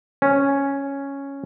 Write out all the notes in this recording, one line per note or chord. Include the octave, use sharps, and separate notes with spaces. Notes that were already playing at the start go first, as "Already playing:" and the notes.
C#4